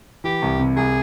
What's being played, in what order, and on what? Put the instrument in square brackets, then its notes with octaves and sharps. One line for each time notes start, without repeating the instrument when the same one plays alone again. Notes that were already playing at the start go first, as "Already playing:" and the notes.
[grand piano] E3 [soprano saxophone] G4
[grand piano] C2
C3
[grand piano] C2 [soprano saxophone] G#4